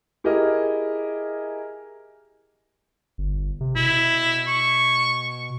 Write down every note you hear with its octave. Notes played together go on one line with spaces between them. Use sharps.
E4 G4 G#4 A#4 D#5
G1
C3
B2 E4
C#6